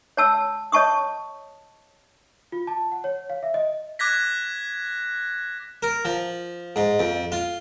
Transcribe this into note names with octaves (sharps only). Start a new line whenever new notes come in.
C#5 A5 E6
C#5 D#5 A5 C#6 D#6
F4
A5
F#5
C#5
F5
E5
D#5
D6 F#6 G#6 A#6 B6
A#4
F3
G#2
F2
F4